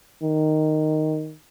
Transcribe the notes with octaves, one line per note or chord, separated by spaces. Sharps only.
D#3